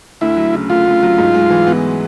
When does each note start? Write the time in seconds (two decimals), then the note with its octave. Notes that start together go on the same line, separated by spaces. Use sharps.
0.21 D2 E4
0.36 F#3
0.53 C#3
0.69 D2 F4
0.86 D2
1.03 F#3
1.18 G#2
1.34 G#3
1.50 E3
1.67 B3